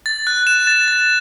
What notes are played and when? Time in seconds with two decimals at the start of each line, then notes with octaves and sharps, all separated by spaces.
0.06 A6
0.27 F#6
0.47 E7
0.67 A6
0.88 A6